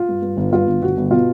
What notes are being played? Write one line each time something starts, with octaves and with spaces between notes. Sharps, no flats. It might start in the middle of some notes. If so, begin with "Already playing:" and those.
Already playing: F4
G2
G2
G1
G2 F4
G1
G1 F#4
G1
B2 F4